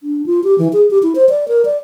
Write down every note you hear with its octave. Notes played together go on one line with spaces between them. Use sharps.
D4
F4
G4
E3
G#4
G4
E4
C5
D5
A#4
D5